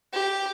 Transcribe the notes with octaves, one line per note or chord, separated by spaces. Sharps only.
G4